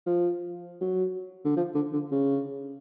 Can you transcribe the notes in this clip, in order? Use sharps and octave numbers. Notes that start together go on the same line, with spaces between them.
F3
F#3
D3
F3
D3
D3
C#3